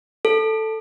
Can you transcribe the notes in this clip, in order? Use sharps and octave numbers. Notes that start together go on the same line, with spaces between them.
A4